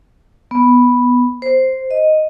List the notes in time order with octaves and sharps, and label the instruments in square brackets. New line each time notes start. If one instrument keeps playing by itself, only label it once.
[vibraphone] B3
C5
D#5